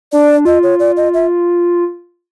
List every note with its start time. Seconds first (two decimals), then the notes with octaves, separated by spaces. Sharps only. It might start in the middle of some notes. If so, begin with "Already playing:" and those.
0.12 D4 D5
0.45 F4 D#5
0.63 C#5
0.79 D5
0.97 D#5
1.14 E5